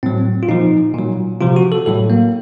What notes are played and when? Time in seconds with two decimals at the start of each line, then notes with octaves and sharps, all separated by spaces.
0.03 A2 F#3 C4
0.43 F4
0.49 A#2 F3 D#4
0.94 A#2 F#3
1.41 C3 F3 F4
1.56 F#4
1.72 A4
1.86 A2 F#3 A4
2.10 A#3